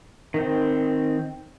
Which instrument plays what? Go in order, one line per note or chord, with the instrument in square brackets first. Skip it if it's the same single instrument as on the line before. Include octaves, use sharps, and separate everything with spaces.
[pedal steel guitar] D#3 C4